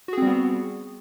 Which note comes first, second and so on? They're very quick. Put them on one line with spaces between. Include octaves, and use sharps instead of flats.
F#4 G#4 C4 G3 B3